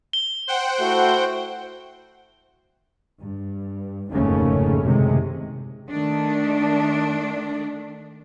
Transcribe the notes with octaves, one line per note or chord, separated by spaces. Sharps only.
G7
C5 F#5 G5
A3 E4 F#4
G2
F1 D#2 G#2 C#3 A3 C#4
F#1 A2 C3 D#3 G#3
D#3 A3 D4